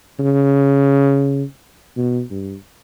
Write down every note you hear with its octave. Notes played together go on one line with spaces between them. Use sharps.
C#3
B2
G2